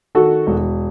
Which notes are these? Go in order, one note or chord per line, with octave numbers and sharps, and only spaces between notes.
D#3 F#4 A4
E1